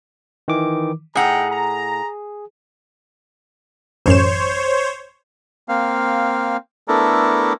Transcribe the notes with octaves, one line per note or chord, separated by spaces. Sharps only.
D#3 E3 D6
A2 D#4 G#4 F#5 G5 A#5
A#5
A1 F#2 C5 C#5 E7
A#3 C4 F5
A3 B3 D4 E4 A4 A#4